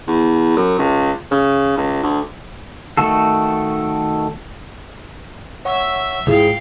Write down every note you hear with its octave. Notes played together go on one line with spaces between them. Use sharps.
E2
F#2
C#2
C#3
C#2
D2
D#3 A3 F#4 A4
C#5 E5 F#5 C#6 E6
C#2 G#2 E4 F4 G#4 F5 G5